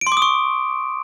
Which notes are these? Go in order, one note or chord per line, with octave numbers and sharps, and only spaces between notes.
D7
C6
D6
D#6
C#6